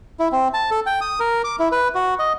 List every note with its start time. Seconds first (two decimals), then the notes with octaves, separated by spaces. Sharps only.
0.20 E4
0.32 C4
0.54 A5
0.71 A4
0.86 G5
1.01 D#6
1.20 A#4
1.44 D6
1.59 E4
1.72 B4
1.95 F#4
2.19 D#5